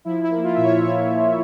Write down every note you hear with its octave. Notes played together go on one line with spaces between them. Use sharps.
F3 E4
E4
A#3
F4
A#2 E5
C#5
A#2 C#5
F3